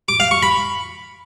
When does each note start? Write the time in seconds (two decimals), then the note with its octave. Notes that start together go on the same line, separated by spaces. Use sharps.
0.08 D6
0.20 F5
0.31 C#6
0.43 B5